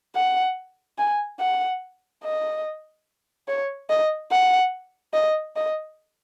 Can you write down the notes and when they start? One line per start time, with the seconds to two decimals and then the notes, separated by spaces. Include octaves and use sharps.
0.15 F#5
0.98 G#5
1.39 F#5
2.24 D#5
3.48 C#5
3.89 D#5
4.31 F#5
5.13 D#5
5.56 D#5